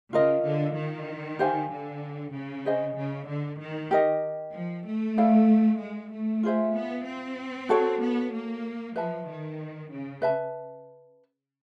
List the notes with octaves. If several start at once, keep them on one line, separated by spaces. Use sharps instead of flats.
C#3 F4 A#4 D#5
D3
D#3
G4 C5 F5 G#5
D3
C#3
G#4 C5 D#5 G#5
C#3
D3
D#3
G4 A#4 D#5
F3
A3
E4 A4 D5 F5
G#3
A3
F4 G#4 C5 E5
B3
C4
F#4 A4 C#5
B3
A#3
F3 B4 E5 A5
D#3
C#3
B4 E5 A5